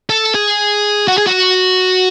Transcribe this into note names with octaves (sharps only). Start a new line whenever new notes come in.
A4
G#4
F#4
G#4
F#4